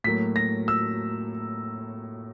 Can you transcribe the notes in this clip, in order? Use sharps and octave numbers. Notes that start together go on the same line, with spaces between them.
A2 F#3 A#3 B6
A#6
E6